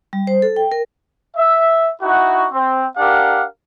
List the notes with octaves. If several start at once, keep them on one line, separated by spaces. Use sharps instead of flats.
G3
C5
A4
G5
A#4
E5
D#4 E4 F#4
C4
D4 G4 A#4 F5 F#5